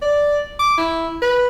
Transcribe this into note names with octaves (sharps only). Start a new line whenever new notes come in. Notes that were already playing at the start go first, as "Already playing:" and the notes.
D5
D6
E4
B4